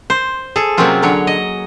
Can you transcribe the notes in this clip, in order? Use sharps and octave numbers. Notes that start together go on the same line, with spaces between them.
C5
G#4 A4
C3 F#3 A#3 C4 C#4 F4
D3 F#3 C#5
D#5